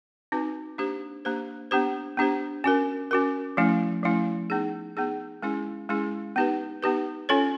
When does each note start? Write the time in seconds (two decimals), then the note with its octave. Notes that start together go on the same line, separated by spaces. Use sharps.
0.32 C4 D#4 F#4 B4
0.78 A#3 D4 G4 C5
1.25 A#3 D4 G4 C5
1.71 B3 D4 G4 C5
2.17 B3 D4 G4 C5
2.64 C#4 F#4 A#4
3.11 C#4 F#4 A#4
3.57 F3 A3 C#4 E4
4.03 F3 A3 C#4 E4
4.50 B3 D#4 G#4
4.97 B3 D#4 G#4
5.42 G#3 C#4 E4 G#4
5.89 G#3 C#4 E4 G#4
6.36 B3 D#4 G4 B4
6.83 B3 D#4 G4 B4
7.29 C#4 F4 A4 C#5